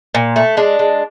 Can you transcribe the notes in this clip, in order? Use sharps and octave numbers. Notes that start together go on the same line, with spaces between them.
A#2
A3
G#3 D4
G#3